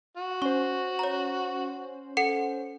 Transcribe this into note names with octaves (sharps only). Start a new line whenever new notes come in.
F#4
C#4 C5 C#6
C#5 A#5
A4 F#5 C#7